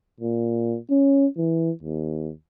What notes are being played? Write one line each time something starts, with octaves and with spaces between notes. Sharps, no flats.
A#2
C#4
E3
D#2